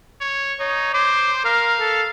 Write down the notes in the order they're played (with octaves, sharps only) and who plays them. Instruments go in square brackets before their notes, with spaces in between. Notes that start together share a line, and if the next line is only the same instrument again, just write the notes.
[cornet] C#5
[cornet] D#4 [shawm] C#5
[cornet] C5 [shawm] D6
[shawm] A#4 [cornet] F5
[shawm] A4